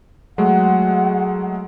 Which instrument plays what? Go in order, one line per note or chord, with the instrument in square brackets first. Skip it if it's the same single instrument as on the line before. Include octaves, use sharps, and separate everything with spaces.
[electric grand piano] F#3 G#3 A3 [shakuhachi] F#5